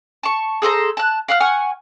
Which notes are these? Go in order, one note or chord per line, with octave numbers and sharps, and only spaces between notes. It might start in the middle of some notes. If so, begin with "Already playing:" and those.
A5 C#6
G#4 A4 C5 A#5
A5 F#6
F5 F#5 D6 F6
F#5 G#5 C#6 F6